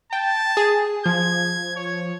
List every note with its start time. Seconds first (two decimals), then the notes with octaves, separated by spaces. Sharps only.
0.13 G5 A5
0.57 G#4
1.06 F3 G#6
1.76 C#5